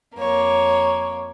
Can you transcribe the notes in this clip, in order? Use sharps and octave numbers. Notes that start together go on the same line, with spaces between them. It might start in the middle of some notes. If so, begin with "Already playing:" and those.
F2 A#3 C#5